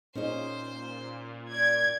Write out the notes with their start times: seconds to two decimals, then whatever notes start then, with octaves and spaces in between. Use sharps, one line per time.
0.15 A#2 C#4 D#4 G#4 C5
1.52 D5 G#6